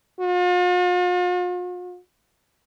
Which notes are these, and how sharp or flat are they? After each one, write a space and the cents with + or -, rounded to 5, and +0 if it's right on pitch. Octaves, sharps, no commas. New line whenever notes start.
F4 +45